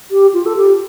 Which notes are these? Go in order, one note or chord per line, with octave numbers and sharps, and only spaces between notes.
G4
F4
A4
G4